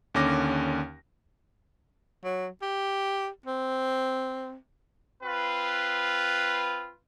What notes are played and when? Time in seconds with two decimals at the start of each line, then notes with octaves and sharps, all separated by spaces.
0.14 D#2 D3 C#4 D6 A#6
2.24 F#3
2.62 G4
3.46 C4
5.23 C4 F4 B4